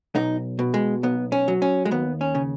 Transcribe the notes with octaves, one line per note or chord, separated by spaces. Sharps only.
B1 D#4
B2
G#3
B1 B3
C#4
F#3
C#4
G#3
D#2 B3
C#4
C#3